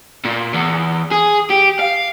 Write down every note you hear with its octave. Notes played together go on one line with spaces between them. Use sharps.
A#2
E2
G#4
G4
F5